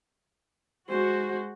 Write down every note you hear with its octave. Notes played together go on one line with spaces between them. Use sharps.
G#3 F#4 C5